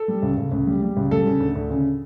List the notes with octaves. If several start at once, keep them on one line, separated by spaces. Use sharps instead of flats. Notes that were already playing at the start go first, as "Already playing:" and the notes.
Already playing: A4
G3
C#2
C#2
C#2
G3
G3
C#2
G3 A4
C#3
D2
D2
C#3